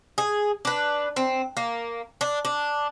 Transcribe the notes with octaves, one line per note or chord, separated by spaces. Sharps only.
G#4
D4 B4
C4
A#3
D4
D4